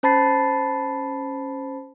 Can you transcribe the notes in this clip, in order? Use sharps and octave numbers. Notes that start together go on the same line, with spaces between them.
C#4 C5 A5 B5 A6 C7